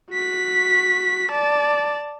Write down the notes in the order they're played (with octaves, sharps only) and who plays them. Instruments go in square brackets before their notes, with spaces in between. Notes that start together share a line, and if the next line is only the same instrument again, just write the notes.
[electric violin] F#4 B6
D5 A5